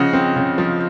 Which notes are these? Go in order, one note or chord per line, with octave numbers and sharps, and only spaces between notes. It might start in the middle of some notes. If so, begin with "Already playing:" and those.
Already playing: C#3 F3 D#5 F#5
C4
C#3
F3